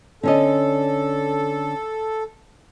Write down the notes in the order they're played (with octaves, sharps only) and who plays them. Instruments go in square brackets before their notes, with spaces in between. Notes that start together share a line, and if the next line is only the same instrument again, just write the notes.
[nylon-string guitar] D3 C#4 D#5 [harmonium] A4